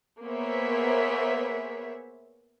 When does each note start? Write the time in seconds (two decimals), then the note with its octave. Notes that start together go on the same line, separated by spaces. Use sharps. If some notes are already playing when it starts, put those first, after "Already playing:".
0.24 A#3 B3 G#4 C5 C#5 E5